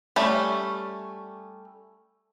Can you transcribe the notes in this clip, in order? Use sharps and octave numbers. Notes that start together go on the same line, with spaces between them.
G3 A3 C#4